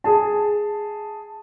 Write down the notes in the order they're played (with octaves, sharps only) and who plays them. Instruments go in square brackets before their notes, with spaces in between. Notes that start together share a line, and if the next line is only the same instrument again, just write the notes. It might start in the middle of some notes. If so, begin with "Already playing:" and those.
[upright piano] G#4 A5